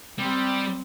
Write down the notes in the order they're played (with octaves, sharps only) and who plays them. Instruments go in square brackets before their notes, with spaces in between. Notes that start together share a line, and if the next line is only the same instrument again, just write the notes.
[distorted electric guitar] G3 [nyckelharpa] C4